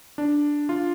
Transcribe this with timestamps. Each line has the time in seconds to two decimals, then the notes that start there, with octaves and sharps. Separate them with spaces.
0.18 D4
0.69 F4